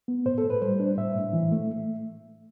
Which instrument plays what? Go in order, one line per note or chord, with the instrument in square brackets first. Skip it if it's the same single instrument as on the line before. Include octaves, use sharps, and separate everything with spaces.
[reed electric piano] B3
A2 C5
A4
A2
B4
G3 C5
D4
A2 E5
A2
E3
A3